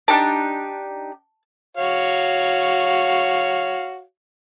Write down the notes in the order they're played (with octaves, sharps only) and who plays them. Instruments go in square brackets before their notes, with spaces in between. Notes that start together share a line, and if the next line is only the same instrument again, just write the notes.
[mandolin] D4 D#4 G4 [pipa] A5
[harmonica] F#4 C#5 F5